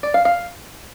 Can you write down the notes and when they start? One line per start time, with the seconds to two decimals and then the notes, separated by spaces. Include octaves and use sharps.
0.03 D5
0.14 F5
0.25 F5